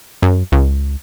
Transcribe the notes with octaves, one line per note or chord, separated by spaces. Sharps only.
F#2
C#2